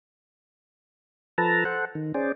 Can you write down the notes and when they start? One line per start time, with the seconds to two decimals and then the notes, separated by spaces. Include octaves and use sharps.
1.38 F3 A4 B4 A5 A#5
1.65 A4 C5 F#5
1.95 D#3
2.14 C#4 G#4 C5 D5